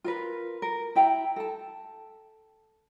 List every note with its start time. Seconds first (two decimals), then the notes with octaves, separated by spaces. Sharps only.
0.04 F4 A#4 B4
0.62 A#4
0.96 E4 G5 A#5
1.36 A4 A5